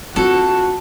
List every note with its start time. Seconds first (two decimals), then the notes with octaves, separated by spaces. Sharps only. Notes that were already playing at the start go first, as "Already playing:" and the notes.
0.16 C4 F4 F#4 A4